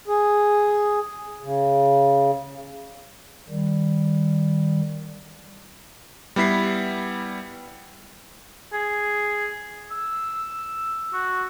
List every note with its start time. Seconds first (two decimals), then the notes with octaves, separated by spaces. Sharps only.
0.08 G#4
1.43 C#3
3.49 D#3 G3
6.36 G3 B3 E4 B6 C7
8.73 G#4
9.91 E6
11.13 F#4